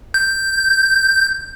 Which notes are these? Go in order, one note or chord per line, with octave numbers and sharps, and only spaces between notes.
G6